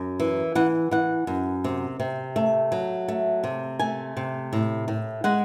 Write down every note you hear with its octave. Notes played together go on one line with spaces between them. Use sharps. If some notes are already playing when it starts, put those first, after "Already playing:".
Already playing: F#2
E3
E3 F#5
E3 F#5
F#2
C3
C3
A3
F#3
A3
C3
A3 G#5
C3
A2
A2
G#3 F#5